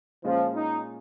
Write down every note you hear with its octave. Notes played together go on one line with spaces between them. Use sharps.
A#2 F3 G#3 C#4 F4
D#4